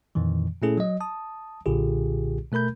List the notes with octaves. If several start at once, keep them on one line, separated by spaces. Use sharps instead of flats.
F2 A#2 D#3 E3
A#2 A3 C#4 E4 G#4 A4
F#3 D#5
A5 D#6
B1 A#2 D3 F4 G4 G#4
B2 A3 A#4 B5 G6